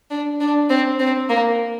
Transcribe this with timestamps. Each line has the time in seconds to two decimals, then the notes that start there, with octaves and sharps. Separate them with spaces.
0.10 D4
0.41 D4
0.70 C4
1.00 C4
1.29 A#3